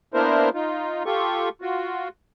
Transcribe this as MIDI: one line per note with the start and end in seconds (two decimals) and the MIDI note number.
0.14 0.49 58
0.14 0.49 59
0.14 0.49 62
0.14 0.49 64
0.14 0.49 70
0.14 0.49 72
0.54 1.03 63
0.54 1.03 65
1.06 1.49 65
1.06 1.49 67
1.06 1.49 69
1.06 1.49 85
1.62 2.08 65
1.62 2.08 66